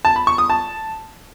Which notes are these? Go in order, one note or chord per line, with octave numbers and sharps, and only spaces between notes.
A5
B5
C#6
D#6
A5